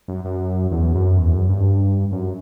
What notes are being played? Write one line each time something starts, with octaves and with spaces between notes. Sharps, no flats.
F#2
F#2
E2
F#2
E2
F#2
G2
F#2